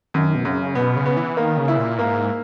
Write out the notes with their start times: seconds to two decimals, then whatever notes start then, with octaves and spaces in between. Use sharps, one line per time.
0.14 F#2 D#3
0.35 B2
0.45 F#2 C#3
0.75 B2 B3
0.96 C#3
1.06 B3
1.17 E3
1.37 D#3 A#3
1.58 C#3
1.68 E4
1.77 A#2
1.98 G#2 A#3